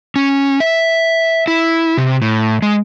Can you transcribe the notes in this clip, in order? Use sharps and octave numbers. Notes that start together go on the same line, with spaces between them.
C#4
E5
E4
C3
A2
G#3